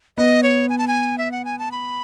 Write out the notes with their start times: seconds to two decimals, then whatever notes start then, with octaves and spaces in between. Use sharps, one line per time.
0.18 B3 D#5
0.43 C#5
0.69 G#5
0.78 A5
0.88 G#5
1.18 E5
1.32 F#5
1.45 G#5
1.59 A5
1.72 B5